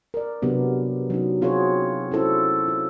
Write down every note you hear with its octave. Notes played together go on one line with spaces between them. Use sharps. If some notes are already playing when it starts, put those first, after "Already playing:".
A#4 D5
C3 F#3 B3 D4
F#3 C#4 D#4
C4 F4 F#4 G#4 C#5
C#4 E4 A4 C5
F4